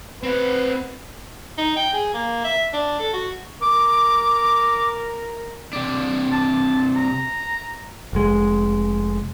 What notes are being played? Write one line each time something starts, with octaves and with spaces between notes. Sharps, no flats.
C4 B4 F#5
D#4
G5
G#4
A#3
E5
D4
A4
F#4
A#4 D6
C3 D4
A5
A#5
F1 G#3